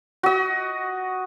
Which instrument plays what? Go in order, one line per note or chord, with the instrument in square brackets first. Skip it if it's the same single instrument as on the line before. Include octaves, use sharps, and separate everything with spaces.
[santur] F#4 D#5